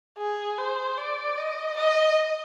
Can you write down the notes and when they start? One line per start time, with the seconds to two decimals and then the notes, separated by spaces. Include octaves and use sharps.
0.18 G#4
0.58 C5
0.98 D5
1.37 D#5
1.77 D#5